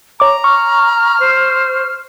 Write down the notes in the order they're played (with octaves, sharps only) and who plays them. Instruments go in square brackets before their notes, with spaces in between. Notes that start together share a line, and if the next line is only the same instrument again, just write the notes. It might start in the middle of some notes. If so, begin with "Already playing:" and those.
[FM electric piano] C#5 D6 [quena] A#5
[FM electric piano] C#6 [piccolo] F6
[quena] C5